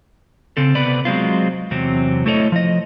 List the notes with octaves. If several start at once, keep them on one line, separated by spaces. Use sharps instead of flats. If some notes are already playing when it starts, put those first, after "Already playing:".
C#3 C4 A4
C3 B3 B4 D5
F#3 G#3 C4 F4
E2 C3 F#3 C4
A3 E4 A4 C#5 D#5
F3 D#5